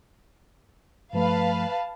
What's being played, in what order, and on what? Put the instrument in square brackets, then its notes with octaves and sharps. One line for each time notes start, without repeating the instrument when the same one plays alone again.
[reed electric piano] G2 F3 A3 [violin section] B4 F5 A5